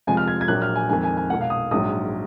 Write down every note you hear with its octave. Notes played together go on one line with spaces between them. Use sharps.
F1 F2 F3 G#3 G#5
F6
G#6
G#6
A#1 A#2 F#3 F#6
F6
G#5
F2 D#3 G#3 G#5
G#5
G#5
B1 A#2 G#3 F#5
F5
D#6
A#1 G#2 F#3 D#6